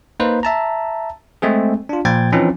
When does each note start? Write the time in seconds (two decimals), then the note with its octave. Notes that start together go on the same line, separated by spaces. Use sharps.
0.20 A#3 D#4 B4 C5
0.43 E5 A5 A#5
1.42 G#3 A3 C4 G#4
1.89 D4 F4
2.05 A#2 F3 G5 G#6 A6
2.32 E3 F3 C4 C#4 D#4